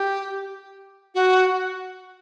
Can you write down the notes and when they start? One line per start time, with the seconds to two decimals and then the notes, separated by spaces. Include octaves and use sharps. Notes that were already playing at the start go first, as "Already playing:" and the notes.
Already playing: G4
1.14 F#4